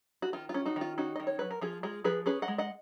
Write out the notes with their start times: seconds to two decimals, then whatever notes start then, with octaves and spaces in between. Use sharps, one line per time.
0.22 F#4
0.33 D#3 F4
0.49 F4
0.54 C#4
0.66 D#4 F#4
0.76 D#3 F4
0.98 C#4 D#4 F#4
1.16 D#3 D#5
1.27 C#5
1.39 F#3 B4
1.51 A#4
1.61 F3 F4 G#4
1.83 G#3 F4 G#4
2.04 F3 G#4 B4
2.26 C#4 G#4 B4
2.42 D#5 F#5
2.48 G#3
2.58 D#5 F#5